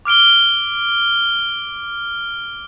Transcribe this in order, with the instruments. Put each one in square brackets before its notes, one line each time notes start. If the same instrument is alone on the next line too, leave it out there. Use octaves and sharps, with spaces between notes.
[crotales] D6 F6 D7 G7